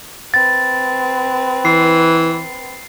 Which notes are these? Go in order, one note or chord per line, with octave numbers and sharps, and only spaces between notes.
C4 B4 A6
E3 C7